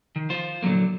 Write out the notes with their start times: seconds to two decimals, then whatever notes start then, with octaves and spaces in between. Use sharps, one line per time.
0.16 D#3
0.30 F4 C5
0.63 A#2 D3 F3 F#3 A#3